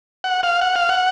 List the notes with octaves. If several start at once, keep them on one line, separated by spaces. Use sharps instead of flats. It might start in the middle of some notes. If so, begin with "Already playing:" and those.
F#5
F5
F#5
F5
F#5